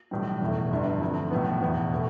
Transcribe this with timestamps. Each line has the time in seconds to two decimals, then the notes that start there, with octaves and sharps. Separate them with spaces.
0.11 B1 A2 E3 G3
0.41 F1 E2 B2 A3 E4
0.71 G1 G2 E3
1.01 D2 C3 F3 A3
1.31 B1 A2 E3 B3
1.61 F1 E2 B2 B3
1.92 B2 A3